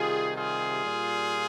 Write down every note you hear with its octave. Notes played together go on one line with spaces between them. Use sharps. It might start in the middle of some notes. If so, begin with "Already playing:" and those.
Already playing: C3 D#3 G3 F4 G#4
F4 G#4
A#2 G3